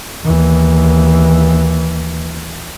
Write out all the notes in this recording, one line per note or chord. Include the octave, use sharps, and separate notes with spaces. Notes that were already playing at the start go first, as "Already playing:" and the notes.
D#2 E3